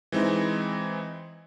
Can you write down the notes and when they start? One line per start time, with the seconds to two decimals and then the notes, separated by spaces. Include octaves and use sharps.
0.12 E3 G#3 C4 D#4 E4